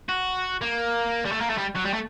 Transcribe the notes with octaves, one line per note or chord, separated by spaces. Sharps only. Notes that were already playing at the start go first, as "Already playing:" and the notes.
F#4
A#3
G3
A3
A#3
A3
G3
F#3
G3
A3